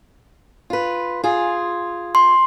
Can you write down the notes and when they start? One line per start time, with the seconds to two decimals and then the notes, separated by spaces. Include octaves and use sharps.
0.70 F4 B4
1.24 F4 G#4
2.15 C6